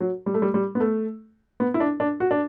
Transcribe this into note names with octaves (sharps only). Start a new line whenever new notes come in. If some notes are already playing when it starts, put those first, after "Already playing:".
F#3
G3
A3
G3
G3
B3
A3
B3
E4
D4
D4
F#4
D4